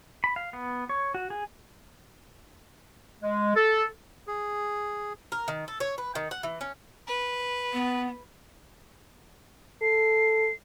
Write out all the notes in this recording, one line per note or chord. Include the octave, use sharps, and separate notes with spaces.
B5
F5
B3
C#5
F#4
G#4
G#3
A4
G#4
A#4
D#3
A4
C#5
B4
D#3
F#5
E3
C#4
B4
B3
A4 C7